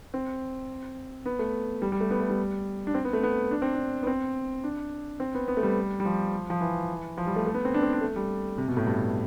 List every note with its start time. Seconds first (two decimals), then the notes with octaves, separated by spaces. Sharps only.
0.14 C4
1.26 B3
1.39 A3
1.82 G3
1.92 G3
2.01 A3
2.11 B3
2.20 A3
2.30 G3
2.87 D4
2.94 C4
3.05 B3
3.13 A3
3.23 B3
3.51 D4
3.62 C4
3.74 D4
4.03 B3
4.07 C4
4.64 D4
5.20 C4
5.35 B3
5.48 B3
5.57 A3
5.63 G3
6.00 G3
6.05 F3
6.50 F3
6.61 E3
7.18 F3
7.27 G3
7.36 A3
7.46 A3
7.54 B3
7.65 C4
7.74 D4
7.83 C4
7.93 D4
8.01 A3
8.16 G3
8.58 C3
8.68 B2
8.77 A2
8.87 G2